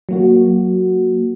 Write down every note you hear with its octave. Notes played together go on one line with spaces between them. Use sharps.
F#3 A#3 F#4